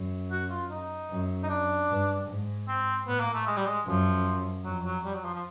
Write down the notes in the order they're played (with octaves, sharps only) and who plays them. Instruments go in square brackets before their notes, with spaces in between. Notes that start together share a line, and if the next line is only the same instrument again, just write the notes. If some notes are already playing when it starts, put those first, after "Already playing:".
Already playing: [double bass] F#2
[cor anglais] F#4
F4
D#4
[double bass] F#2
[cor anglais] D#4
D4
[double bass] G2
G#2
[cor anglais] C4
[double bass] A2 [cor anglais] B3
[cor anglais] A#3
A3
G#3
G3
G#3
[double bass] F#2 [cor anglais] F3
[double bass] F2 [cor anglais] F#3
[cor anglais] F#3
G3
F#3
F3
F3